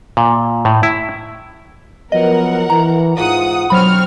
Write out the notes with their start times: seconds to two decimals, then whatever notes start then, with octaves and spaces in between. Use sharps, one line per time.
0.17 A#2
0.65 A2
0.83 E4
2.12 F3 F#3 B3 A#4 D#5 F#5
2.70 E3 A#5
3.17 G#2 F4 F#5 D#6
3.70 D2 B2 F#3 C4 B5 C#6 F6